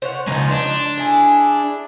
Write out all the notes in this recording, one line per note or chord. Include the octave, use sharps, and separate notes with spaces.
C5 C#5 F#5
C#3 F3 G#3 D#4
D4
E4 G#4